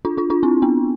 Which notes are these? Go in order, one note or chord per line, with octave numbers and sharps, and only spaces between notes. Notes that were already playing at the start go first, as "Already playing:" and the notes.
D4 F4
D4 F4
D4 F4
C4 E4
B3 D4